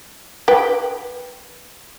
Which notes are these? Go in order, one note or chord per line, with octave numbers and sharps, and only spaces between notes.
B4 G5